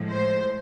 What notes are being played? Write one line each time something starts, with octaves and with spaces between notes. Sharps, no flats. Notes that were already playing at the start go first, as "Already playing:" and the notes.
Already playing: A2 F3 G#3
C5